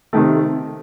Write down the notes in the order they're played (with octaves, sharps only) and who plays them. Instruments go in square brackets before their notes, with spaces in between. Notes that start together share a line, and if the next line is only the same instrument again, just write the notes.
[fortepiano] C3 D#3 A3